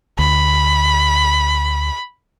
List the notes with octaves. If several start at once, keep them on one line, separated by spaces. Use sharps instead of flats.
D2 B5